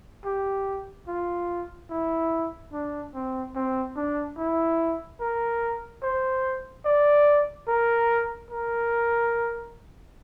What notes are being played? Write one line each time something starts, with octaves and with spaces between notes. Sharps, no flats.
G4
F4
E4
D4
C4
C4
D4
E4
A#4
C5
D5
A#4
A#4